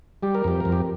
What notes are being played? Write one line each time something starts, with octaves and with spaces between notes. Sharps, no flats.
G3 G4
A#4
F2 G4
F2 A#4
G4